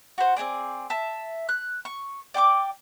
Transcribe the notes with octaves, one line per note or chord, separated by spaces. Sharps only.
F#4 C5
C4 D4 G#4 D5
E5 A5
F#6
C#6
D5 G5 C#6 D6